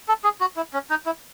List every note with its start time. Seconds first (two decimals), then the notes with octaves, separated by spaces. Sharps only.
0.08 A4
0.24 G#4
0.41 F#4
0.57 E4
0.74 C#4
0.90 D#4
1.06 E4